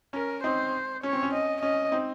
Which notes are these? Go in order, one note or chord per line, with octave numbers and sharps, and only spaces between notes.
C#4 A#4
C4 D#4 C5
C#4 C#5
C4
C#4
D#5
C#4 D#5
C4 D#4